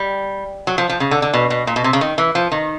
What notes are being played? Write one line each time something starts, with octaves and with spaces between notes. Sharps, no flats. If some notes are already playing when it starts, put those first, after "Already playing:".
Already playing: G3
F#3
F3
F3
C#3
D3
D3
B2
B2
A#2
B2
C3
C#3
D#3
E3
F3
D#3